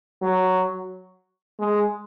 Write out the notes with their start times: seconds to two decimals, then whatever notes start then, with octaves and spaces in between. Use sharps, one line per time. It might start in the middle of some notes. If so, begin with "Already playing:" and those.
0.22 F#3
1.59 G#3